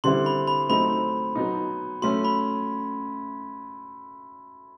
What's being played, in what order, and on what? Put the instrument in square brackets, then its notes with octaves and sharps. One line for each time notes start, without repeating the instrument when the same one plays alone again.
[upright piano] D3 G3 C4 E4 [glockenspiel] C6
[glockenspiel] B5
B5
[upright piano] F#3 A3 C4 D#4 [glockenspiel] B5
[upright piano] F#3 B3 D#4
[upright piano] F#3 A3 C#4 [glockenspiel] C6
[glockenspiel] B5